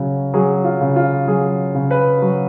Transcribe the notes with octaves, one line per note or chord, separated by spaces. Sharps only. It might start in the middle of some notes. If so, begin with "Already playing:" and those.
Already playing: C#3 F#3
F#3 G#4
F4
C#3
F4
F#3 G#4
C#3
B4
F#3